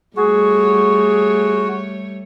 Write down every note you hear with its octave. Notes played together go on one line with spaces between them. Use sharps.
G3 A3 F#4 G#4 C#5